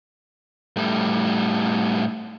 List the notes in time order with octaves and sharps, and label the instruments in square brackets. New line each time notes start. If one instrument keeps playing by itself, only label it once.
[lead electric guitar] A2 G3